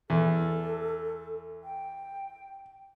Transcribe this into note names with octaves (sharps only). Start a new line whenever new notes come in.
E2 A4
G5